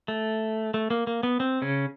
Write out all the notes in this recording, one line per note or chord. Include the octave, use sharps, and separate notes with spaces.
A3
A3
A#3
A#3
B3
C4
C#3 C#4